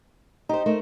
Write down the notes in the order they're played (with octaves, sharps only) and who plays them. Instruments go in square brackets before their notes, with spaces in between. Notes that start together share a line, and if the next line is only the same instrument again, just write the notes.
[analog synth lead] D#4 [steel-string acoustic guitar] G4 C5
[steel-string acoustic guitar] A3 A#4 C5